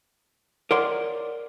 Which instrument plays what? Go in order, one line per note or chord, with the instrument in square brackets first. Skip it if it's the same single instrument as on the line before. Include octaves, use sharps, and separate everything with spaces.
[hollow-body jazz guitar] A#4 C#5 D5 F#5 C6